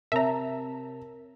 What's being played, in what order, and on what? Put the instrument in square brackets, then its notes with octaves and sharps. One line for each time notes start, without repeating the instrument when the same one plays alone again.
[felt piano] C3 A5 [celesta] A#4 C#5 [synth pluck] E5 A#5